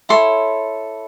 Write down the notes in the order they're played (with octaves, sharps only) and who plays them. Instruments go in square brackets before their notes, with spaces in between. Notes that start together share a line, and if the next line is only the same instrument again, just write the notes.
[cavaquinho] E4 A4 C#5 C6